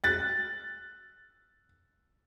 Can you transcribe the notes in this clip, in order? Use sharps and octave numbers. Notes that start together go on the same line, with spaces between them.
F#6 A6